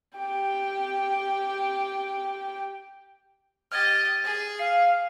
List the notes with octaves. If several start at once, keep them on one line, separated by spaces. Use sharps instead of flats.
G4 G5
G4 D#5 F6 G#6 A6
G#4
F5 C7